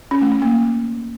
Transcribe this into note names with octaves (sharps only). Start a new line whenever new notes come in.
C#4
A3
C#4
A#3